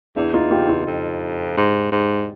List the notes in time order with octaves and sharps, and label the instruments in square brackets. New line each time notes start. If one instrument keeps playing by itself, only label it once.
[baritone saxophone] E2 [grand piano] D4 E4
[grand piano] D#4 F4
F4 G4
F4 G4
[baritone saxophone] F2
G#2
G#2